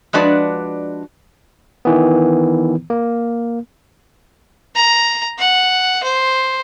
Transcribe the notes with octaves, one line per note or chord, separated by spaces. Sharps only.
F3 G#3 D4 F#4 B4 D5
D#3 E3 B3
A#3
A#5
F#5
C5